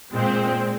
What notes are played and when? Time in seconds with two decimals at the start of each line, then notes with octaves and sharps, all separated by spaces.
0.12 A#2 G#3 C4